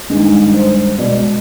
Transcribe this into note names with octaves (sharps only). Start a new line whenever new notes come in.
G2 D#3 G#3
C5
C5
B2 G#3 D5